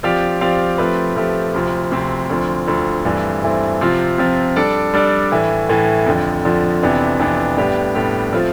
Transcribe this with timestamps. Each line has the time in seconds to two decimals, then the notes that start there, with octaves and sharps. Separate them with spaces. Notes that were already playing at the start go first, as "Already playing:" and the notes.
0.03 F3 C4 G4 D5 F5
0.41 F3 C4 G4 D5 F5
0.78 F3 A3 C4 G4 B4
1.16 F3 A3 C4 G4 B4
1.54 D2 C3 F3 C4
1.91 D2 C3 F3 C4
2.29 D2 D3 F3 C4
2.67 D2 D3 F3 C4
3.05 G2 E3 A3 C4
3.43 G2 E3 A3 C4
3.81 C3 F3 C4 F4
4.18 C3 F3 C4 F4
4.56 G3 D4 A4 D5
4.94 G3 D4 A4 D5
5.32 A2 E3 A3
5.69 A2 E3 A3
6.06 F2 D3 F3
6.45 F2 D3 F3
6.83 F2 C3 E3 B3 D4
7.19 F2 C3 E3 B3 D4
7.57 A2 G3 B3 D4 G4
7.95 A2 G3 B3 D4 G4
8.33 F3 A3 C4 F4 C5